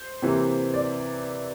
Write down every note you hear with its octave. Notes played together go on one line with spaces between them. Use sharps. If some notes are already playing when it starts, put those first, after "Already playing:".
Already playing: C5
C3 E3 A#3
D5